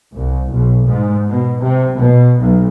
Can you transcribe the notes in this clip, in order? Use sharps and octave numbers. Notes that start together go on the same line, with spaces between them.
C2
B1
G#2
B2
C3
B2
B1